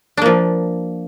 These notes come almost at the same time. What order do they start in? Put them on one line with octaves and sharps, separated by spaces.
D4 A#3 F3